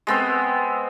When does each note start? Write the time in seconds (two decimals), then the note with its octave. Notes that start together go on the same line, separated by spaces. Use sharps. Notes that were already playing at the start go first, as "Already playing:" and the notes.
0.07 G#3 B3 C4